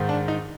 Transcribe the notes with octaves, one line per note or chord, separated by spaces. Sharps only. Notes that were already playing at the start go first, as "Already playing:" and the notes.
Already playing: G#2 D#3
D4
D#4